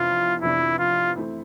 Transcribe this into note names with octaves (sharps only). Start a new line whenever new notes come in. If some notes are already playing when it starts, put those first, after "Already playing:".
Already playing: F2 C3 E3 B3 D4 F4
F2 C3 E3 B3 D4 E4
F4
E3 A3 C4 E4